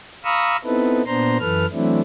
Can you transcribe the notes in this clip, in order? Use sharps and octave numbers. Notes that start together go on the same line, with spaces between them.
F5 A#5 B5 C#6 D#6 E6
B3 C4 D#4 E4 A4 B4
A#2 B3 D4 C5 A#5 C6
F#2 E3 A4 B4 F6
E3 F#3 A3 C4 D4 E4